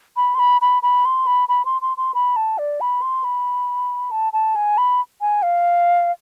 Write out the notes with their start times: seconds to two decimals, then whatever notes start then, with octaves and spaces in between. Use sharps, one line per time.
0.17 B5
0.35 C6
0.39 B5
0.61 B5
0.83 B5
1.05 C6
1.27 B5
1.49 B5
1.65 C6
1.82 C6
1.97 C6
2.14 B5
2.36 A5
2.58 D5
2.81 B5
3.02 C6
3.24 B5
4.11 A5
4.33 A5
4.55 G#5
4.78 B5
5.21 G#5
5.42 F5